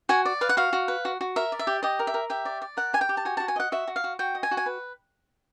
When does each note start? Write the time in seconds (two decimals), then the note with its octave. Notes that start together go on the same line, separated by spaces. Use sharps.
0.09 F#4 G#5
0.25 D5
0.41 B4 F5
0.49 F#5
0.57 F#4 F5
0.73 F#4
0.88 B4
1.05 F#4
1.21 F#4
1.36 A#4 E5
1.52 D5
1.59 E5
1.67 G4
1.83 G4 D#5
1.99 A#4
2.07 E5
2.14 A#4
2.30 G4 E5
2.45 D5
2.62 D5
2.77 A#4 F#5
2.93 G4 G#5
3.01 G5
3.09 G4
3.17 A5
3.25 F#4 G#5
3.37 F#4 A5
3.48 G#5
3.56 D#5 F#5
3.72 F#4 E5
3.87 F#4
3.96 F5
4.04 F#4
4.19 F#4 G5
4.35 D#5
4.43 G#5
4.51 F#4
4.57 G#5
4.66 B4